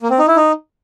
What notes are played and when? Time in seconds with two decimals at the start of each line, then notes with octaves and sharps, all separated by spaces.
0.01 A#3
0.10 C4
0.19 D#4
0.28 E4
0.36 D#4